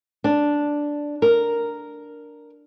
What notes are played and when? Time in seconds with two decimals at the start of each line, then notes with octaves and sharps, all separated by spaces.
0.24 D4
1.22 A#4